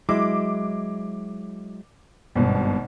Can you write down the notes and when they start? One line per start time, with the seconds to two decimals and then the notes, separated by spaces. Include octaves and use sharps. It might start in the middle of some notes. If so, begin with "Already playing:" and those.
0.09 F#3 G#3 E4 D6
2.35 G#1 G2 B2